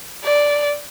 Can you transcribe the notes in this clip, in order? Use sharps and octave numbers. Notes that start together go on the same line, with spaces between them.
D5